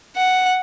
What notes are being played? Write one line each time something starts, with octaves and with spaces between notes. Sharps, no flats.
F#5